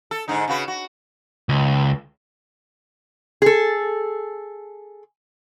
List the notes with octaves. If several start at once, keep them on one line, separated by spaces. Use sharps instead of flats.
A4
G#2 D3 D#4
C#3 F#4 B4
F#4
C#2
G#4 A4